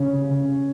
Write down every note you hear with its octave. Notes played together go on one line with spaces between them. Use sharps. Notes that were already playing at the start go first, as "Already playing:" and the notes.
Already playing: C#3 C#4